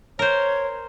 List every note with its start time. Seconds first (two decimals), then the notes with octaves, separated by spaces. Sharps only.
0.19 A#4 C5 C#5